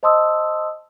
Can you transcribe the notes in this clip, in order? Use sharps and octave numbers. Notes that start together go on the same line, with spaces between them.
C5 D#5 A5 C6 D#6 E6